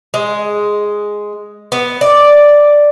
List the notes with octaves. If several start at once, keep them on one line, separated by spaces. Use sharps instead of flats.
G#3
B3
D5